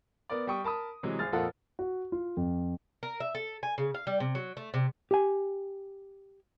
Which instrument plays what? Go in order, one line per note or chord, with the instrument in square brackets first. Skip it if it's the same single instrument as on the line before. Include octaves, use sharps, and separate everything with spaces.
[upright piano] B3 A#4 D5
G3 G5 C#6 D#6
A#4 A5 B5 D#6
C3 E3 F#3 G#3
G#1 G#4 F6 A6
F2 A#2 F4 A4 A#4 F#5
[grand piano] F#4
F4
F2
[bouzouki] A#4
E5
A4
G#5
C#3
F5
G3
C3
F#3
A3
C3
[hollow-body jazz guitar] G4 G#5